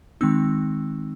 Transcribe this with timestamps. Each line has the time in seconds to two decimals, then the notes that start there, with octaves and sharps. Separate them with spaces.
0.21 D#3 G#3 C4 D#4 E6